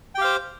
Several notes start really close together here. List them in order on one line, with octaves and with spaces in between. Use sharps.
G5 G4 F5 C5